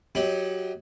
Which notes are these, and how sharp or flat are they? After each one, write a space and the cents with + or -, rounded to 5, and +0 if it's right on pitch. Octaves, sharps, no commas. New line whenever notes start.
F#3 +0 D#4 +30 G4 +0